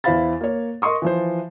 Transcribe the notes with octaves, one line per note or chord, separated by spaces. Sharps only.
E2 E4 C5 F5 B5 A6
A#3 C#5
A#4 D#5 C6 C#6 D#6
E3 F3 C5